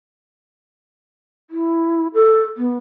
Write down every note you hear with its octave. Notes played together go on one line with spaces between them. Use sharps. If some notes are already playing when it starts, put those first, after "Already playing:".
E4
A4
B3